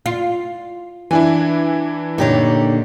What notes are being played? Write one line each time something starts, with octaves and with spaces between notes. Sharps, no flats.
F4
E3 D4 E4 G#5
A#2 D3 D#4 G4 C#5